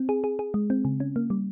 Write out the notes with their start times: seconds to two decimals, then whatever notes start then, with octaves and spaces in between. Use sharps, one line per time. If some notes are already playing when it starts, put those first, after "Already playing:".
Already playing: C4
0.09 G#4
0.24 G#4
0.39 G#4
0.54 G#3
0.70 C4
0.85 C#3
1.00 C#4
1.16 A#3
1.30 G3